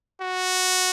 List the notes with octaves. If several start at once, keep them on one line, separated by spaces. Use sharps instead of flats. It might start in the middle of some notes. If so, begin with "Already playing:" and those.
F#4